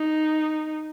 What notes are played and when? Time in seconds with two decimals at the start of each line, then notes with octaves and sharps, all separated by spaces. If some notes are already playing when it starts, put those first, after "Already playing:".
Already playing: D#4